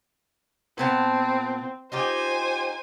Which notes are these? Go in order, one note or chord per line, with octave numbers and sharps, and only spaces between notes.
A#2 B3 C4 A5
D#4 F4 G4 C5 G#5